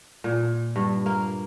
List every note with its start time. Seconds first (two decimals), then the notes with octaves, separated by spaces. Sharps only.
0.24 A#2
0.76 G2
1.06 A#3